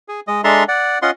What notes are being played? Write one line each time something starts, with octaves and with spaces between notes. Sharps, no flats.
G#4
G#3 D#5
G#3 D4 A4 E5 A#5 C6
D5 F#5
C#4 F4 D#5 F#5 C6